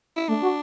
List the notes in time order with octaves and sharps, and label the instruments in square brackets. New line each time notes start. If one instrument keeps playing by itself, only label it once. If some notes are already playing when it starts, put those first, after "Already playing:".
[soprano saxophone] E4
[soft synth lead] A3 [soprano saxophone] D4
[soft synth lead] F#4